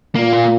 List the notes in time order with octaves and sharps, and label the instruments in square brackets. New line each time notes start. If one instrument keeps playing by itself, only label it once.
[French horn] A#2 [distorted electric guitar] A#3
[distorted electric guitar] F4